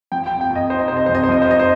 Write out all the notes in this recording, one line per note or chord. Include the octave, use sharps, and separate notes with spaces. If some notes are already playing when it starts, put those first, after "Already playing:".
F3 G5
G5
F2
G5
F2
D#5
D#4 C5
D#5
C3 C5
D#5
F2 C5
D#5
C5
F3 D#5
C5
D#4 D#5
C5